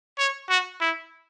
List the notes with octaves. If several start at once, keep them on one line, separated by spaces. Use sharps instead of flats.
C#5
F#4
E4